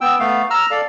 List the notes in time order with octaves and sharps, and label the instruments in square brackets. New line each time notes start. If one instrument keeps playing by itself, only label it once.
[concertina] B3 G5 E6
A3 B3 F5
A#5 E6 F6
A4 D5 F5